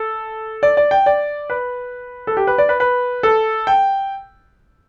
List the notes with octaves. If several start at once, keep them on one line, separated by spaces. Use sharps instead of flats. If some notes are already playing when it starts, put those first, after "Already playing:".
Already playing: A4
D5
D5
G5
D5
B4
A4
G4
B4
D5
B4
B4
A4
G5